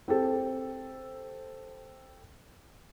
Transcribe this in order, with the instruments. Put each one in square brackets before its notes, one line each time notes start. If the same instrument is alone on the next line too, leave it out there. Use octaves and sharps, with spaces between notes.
[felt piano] C4 G4 A4